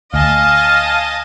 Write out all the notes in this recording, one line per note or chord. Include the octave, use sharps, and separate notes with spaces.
D2 D#5 F5 G#5 A5